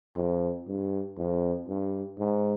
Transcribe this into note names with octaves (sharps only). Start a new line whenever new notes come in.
F2
G2
F2
G2
G#2